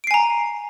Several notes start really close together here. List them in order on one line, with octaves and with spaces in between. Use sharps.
D7 C7 G#5 A#5